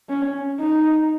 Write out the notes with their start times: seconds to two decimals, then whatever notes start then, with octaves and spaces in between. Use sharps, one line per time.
0.09 C#4
0.60 D#4